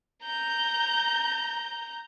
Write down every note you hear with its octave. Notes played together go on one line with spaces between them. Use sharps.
A#5 G6